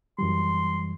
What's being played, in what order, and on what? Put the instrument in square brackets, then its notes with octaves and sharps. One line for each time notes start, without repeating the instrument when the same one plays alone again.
[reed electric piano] F#2 E3 G3 [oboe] C6